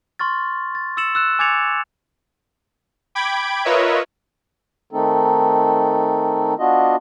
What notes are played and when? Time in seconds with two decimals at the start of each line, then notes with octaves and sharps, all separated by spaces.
0.19 C6 C#6 F6 A6
0.75 A6
0.97 E6 A6 C#7 E7 F#7
1.15 E6 F#6 E7
1.39 G#5 D6 G#6 A6 C#7 F7
3.15 G5 B5 D6 G#6 D7
3.65 F4 A#4 B4 C#5 D#5 E5
4.91 D#3 A3 C4 D#4 A4
6.59 B3 D4 F4 F#4 D#5